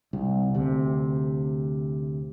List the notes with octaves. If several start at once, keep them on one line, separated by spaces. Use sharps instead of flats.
C2
D2 C3